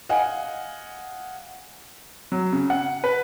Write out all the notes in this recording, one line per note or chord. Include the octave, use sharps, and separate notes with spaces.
D#5 F5 F#5 G#5
F#3
C#3
F#5
B4